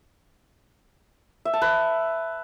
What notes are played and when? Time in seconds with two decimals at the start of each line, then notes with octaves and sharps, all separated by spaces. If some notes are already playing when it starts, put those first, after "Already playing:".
1.45 E5
1.54 A5
1.62 B4